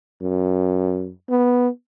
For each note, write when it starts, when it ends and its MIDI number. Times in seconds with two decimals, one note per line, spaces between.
0.21 1.11 42
1.30 1.68 59